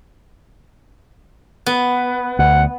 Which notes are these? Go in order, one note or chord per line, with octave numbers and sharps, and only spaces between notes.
B3
D2 F#5